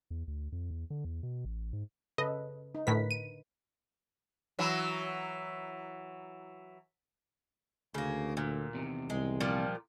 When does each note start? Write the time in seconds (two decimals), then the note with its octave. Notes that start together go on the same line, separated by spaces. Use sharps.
0.10 E2
0.28 D2
0.52 F2
0.71 E2
0.90 D3
1.05 E2
1.23 B2
1.45 A1
1.73 G#2
2.18 C#3 A4 B4 D#5
2.75 D#4
2.87 A2 D3 A#4 B4 B6
3.11 D#7
4.59 E3 F#3
7.94 D2 C#3 A#3
8.37 A#2 D3
8.73 E2 C3 D#3
9.10 C2 G#3
9.41 A#2 F3 G3